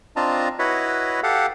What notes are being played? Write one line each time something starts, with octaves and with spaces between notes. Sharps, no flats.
C4 D4 F4 D#5 A5 A#5
E4 F#4 B4 C#5 D#5 B5
G4 A4 F5 F#5